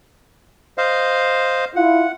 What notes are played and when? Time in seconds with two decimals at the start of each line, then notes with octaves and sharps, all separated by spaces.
0.78 C5 D#5 F5
1.76 E4 F4 F#5